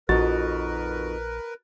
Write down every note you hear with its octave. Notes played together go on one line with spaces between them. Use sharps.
A#1 F2 D#4 F#4 A#4 B4 A6